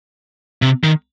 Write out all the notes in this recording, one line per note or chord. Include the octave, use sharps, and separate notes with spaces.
C3
D#3